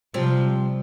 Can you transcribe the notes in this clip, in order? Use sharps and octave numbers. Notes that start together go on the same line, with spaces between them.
C3 F3 G3 C4